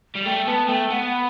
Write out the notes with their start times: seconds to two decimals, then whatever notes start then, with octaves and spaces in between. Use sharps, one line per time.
0.15 G3
0.25 A3 G5
0.47 B3 A5
0.68 A3 G5
0.91 B3 F#5